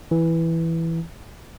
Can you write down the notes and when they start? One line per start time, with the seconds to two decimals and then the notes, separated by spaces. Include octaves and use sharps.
0.11 E3